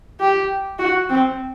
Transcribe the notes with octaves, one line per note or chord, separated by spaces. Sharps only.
G4
F#4
C4